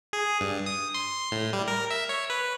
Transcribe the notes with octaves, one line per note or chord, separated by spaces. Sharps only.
G#4
G2
D#6
C6
A2
G3
A#4
E5
C#5
B4